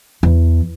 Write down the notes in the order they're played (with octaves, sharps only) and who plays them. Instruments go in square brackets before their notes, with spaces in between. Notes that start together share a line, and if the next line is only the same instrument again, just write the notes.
[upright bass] E2